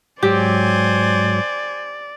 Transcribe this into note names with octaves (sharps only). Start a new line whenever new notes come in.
G#2 F#3 G4 C5 D5 G#5